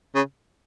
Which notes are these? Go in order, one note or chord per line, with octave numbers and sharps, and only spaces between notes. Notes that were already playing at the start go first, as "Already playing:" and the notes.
C#3